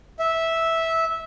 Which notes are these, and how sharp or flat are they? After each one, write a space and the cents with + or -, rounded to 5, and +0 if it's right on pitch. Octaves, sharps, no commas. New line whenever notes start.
E5 -10